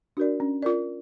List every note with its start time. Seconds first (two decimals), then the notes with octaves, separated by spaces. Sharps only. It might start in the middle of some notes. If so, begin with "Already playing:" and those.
0.17 D4 F#4 A#4 D5
0.40 C#4
0.63 F4 A#4 D5